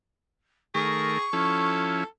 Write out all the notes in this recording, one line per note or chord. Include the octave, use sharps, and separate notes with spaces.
D#3 A3 G#4 A#4 C#6
F3 C#4 E4 A4